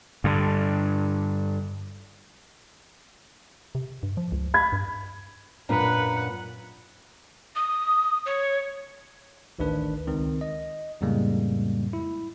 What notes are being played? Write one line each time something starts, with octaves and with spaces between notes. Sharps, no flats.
G2 D3
C3
G2
F3
C#2
B5 G#6
G2
F#2 A#2 D4 B4 F#5 A#5
D#6
C#5
A1 D2 D#3 D4 B4
C#2 D#3 C4
D#5
F2 A2 C#3 G3 G#3 A#3
E4